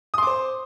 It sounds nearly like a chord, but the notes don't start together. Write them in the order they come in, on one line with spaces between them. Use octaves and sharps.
D#6 C6 D6 C5